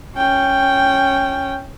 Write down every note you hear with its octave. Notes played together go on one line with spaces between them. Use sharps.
C#4 G5